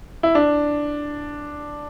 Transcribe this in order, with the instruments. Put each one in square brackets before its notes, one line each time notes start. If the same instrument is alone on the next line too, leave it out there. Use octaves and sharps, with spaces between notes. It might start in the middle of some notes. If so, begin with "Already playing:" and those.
[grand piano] E4
D4